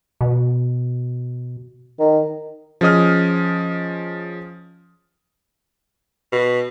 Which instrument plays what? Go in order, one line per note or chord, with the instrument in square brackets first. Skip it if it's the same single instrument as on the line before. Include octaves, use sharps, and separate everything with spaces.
[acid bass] B2
[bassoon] D#3
[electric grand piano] F3 C#4 G#4 D#5 D#6 F6
[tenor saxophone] B2